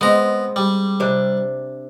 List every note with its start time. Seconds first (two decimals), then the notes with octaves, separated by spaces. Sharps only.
0.01 G#3 B3 C4 A#5
0.56 G3
1.00 C3 D4